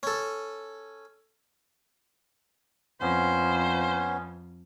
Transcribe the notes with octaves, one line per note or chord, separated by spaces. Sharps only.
C#4 A4
F2 B3 C#4 C5